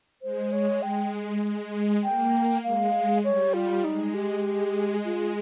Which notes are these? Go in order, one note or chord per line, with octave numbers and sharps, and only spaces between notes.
G#3 C5
G#3 C#5
G#3 G5
G#3
A#3 G5
G#3 F5
G3 C#5
F4
G#3 D#4
G4
G#3
F4